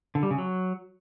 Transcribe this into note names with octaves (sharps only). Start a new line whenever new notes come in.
D3
G3
C#3
F#3